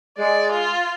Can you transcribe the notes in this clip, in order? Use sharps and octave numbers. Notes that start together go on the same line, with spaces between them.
G#3 D5
F4